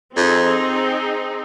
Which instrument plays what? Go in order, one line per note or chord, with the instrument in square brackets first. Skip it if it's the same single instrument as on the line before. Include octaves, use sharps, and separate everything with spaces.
[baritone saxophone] F2 [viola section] C4 D#4 G#4